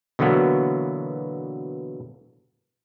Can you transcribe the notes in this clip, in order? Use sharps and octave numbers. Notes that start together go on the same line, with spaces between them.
B2 D3 E3 F#3 A#3 B3